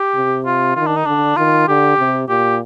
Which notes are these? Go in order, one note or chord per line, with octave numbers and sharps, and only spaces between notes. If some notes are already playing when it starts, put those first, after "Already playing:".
Already playing: G4
C3
F4
D#3 F4
D4
D#4
D3 D4
D#3 F4
D3 G4
C3
A#2 G4